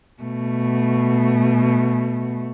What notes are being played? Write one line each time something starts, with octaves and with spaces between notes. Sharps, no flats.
B2 A3